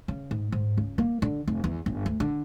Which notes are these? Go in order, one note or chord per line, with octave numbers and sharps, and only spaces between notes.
C#3
G#2
G#2
C#2
A#3
D3
F1
E2
G1
D2
D3